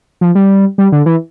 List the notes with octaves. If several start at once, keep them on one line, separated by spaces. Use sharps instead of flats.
F3
G3
G3
D3
E3